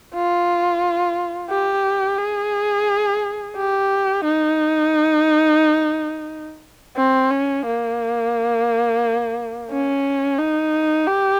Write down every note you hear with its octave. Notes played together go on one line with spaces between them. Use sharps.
F4
G4
G#4
G4
D#4
C4
C#4
A#3
C#4
D#4
G4